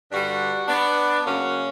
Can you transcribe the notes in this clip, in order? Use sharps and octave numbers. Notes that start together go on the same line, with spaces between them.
G2 D3 G3 D4 F#4
B3 D4
F#2 C#3 F#3 A#3 C#4